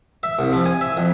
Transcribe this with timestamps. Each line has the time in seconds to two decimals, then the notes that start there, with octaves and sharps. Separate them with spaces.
0.23 E5
0.39 C2
0.53 F3
0.66 G#5
0.81 E5
0.97 F2